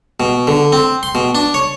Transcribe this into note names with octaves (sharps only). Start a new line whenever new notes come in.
B2
D3
C4
C6
B2
D4
C#5